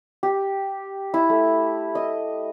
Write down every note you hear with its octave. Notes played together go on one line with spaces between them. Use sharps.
G4
E4
A3
D#5